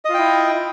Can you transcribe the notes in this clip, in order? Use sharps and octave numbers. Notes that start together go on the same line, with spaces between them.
E4 F4 D#5 G5